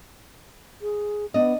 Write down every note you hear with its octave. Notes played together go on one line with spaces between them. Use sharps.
G#4
B3 D4 D#5